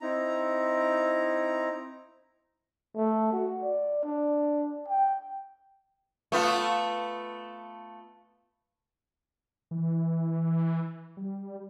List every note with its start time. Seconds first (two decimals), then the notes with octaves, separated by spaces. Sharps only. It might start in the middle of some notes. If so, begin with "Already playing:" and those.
0.01 C4 D#4 E4 A#5
2.96 A3
3.32 F#4
3.62 D5
4.04 D4
4.88 G5
6.32 A3 B3 F4
9.71 E3
11.17 G3